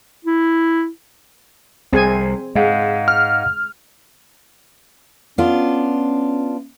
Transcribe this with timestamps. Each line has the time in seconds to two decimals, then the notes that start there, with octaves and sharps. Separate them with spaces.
0.25 E4
1.93 C2 C4 G#4 G#5
2.56 G#2 G#3 D#5 F5 F#5
3.08 F6
5.38 B3 C#4 D4 F4